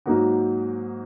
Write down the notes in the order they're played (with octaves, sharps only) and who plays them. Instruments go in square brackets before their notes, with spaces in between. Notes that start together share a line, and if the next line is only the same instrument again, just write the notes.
[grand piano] G#2 F#3 A#3 D#4 F#4